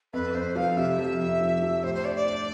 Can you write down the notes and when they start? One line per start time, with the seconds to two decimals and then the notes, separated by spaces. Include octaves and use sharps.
0.13 F2 B4
0.35 F2 C5
0.55 F3 F5
0.77 C3 E5
0.99 F3
1.19 F2
1.41 F3
1.62 F3
1.84 A2 C5
1.94 C5
2.05 D4 D5
2.16 D5
2.26 D4